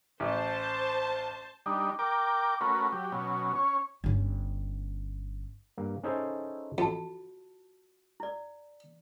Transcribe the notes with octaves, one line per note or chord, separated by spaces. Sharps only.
A1 C5 A5
G3 D4 D#4
A#4 G5 D6
A3 C#4 F#4 A#4 B4
F#3 G4
B2 F#3 C#4
C#4 C#5
G1 C#4
G2 A#3
C#4 D#4 E4 G#4 A4 C5
F2 F4 F#4 A5
E4 D5